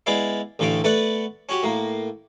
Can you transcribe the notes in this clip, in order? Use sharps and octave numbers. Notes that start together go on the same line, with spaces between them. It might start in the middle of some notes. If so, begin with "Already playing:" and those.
G#3 B3 E4 D5 F5
A1 A2 D3 A4 F5 D6
A3 B3 A4 B4 D5 F#5
C#4 F#4 G4
A2 A#3